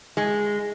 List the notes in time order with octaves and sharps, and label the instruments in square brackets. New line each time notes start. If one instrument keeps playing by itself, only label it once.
[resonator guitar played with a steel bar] G#3